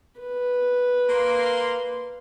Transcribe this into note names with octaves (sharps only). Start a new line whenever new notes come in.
B4
A#3 C6